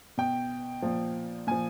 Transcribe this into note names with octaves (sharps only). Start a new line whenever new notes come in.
B2 G5
A#2 F3
A#2 F3 G#5